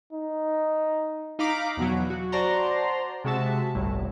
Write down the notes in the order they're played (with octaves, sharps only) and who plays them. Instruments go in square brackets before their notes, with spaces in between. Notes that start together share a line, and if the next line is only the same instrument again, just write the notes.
[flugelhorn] D#4
[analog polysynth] D#4 F5 A#5 B5 D6
E2 B2 F#3
F#4
F#4 C5 D5 A5 A#5 C6
C3 G#3 F#4 E5 A5
G1 C2 A2